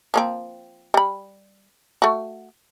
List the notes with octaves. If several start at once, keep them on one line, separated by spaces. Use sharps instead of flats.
F3 A#3 C4
G3 B5
A3 F#4